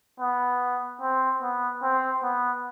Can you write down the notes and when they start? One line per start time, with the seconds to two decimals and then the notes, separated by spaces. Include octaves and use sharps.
0.20 B3
1.01 C4
1.42 B3
1.82 C4
2.23 B3